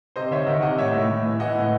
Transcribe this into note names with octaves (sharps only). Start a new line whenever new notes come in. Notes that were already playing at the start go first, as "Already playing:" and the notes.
C3 C5 D#5
D#3 C#5 E5
D#3 D#5 F#5
C3 D#5 F#5
A2 C#5 E5
A2
A2
E3
E3 D#5 F#5
A2